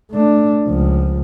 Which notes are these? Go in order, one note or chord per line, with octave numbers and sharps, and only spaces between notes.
A3 D4
C#2 F3